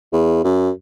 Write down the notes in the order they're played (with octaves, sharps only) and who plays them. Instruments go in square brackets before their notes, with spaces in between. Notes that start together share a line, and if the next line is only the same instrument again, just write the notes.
[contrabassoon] E2
F#2